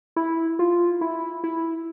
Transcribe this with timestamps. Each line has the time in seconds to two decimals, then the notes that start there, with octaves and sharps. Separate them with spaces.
0.16 E4
0.59 F4
1.01 E4
1.44 E4